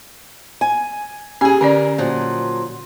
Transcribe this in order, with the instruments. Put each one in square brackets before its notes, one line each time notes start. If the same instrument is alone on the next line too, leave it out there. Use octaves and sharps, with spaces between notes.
[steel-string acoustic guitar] G#5
[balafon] C#4 G4 [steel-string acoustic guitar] G#4 G#5
[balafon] D3 C#4 D5 [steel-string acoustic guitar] A#4
[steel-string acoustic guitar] A#2 F3 F#3